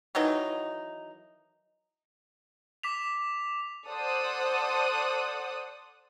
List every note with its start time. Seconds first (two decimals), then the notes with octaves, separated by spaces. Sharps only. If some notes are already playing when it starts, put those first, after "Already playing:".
0.15 D#3 E3 F#3 D#4
2.83 D6 B6 F7
3.86 A4 C5 D5 F#5 D#6 F#6